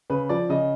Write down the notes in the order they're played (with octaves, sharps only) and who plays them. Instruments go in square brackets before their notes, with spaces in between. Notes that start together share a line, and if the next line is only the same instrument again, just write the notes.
[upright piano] C#3 B4
F3 D5
C#3 D#5